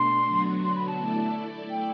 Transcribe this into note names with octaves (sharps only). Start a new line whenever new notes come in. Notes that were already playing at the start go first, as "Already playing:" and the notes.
Already playing: B2 A3 D4 C6
D3 F#3 B3 F#4
C6
B5
A5
A3 E4 A4 D5
G5